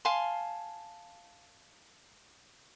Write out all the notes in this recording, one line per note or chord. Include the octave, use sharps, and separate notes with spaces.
F5 G#5 A5 C6